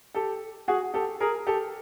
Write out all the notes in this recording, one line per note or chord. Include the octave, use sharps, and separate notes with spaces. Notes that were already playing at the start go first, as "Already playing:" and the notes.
G4 A4
F#4 G#4
G4 A4
G#4 A#4
G4 A4